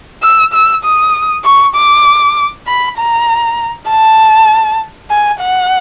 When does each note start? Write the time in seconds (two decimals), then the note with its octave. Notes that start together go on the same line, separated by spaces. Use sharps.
0.23 E6
0.53 E6
0.84 D#6
1.45 C#6
1.76 D6
2.67 B5
2.98 A#5
3.89 A5
5.10 G#5
5.40 F#5